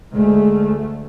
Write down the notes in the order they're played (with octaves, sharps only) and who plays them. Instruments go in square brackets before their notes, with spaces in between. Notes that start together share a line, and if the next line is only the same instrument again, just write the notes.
[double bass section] D2 A3 [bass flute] G#3